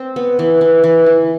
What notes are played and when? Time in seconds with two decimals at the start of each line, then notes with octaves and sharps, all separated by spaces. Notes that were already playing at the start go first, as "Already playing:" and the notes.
Already playing: C4
0.16 B3
0.39 E3
0.61 E3
0.84 E3
1.06 E3